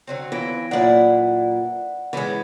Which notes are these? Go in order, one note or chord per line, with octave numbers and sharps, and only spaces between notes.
D3 F#3 C4
E3 B3 A#6 D7
F#2 A#2 D4 E4 B4 F#5
A2 C#3 E3 G#3 B3